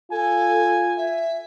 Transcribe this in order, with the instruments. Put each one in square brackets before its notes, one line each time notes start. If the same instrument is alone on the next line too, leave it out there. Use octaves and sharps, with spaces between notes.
[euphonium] F4 [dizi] A4 [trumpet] G#5
[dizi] E5